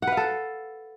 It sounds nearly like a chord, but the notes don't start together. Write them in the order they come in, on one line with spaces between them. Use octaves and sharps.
F#5 B4 F5 A4